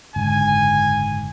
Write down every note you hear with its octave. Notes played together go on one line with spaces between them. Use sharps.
F#1 G#2 D3 G#5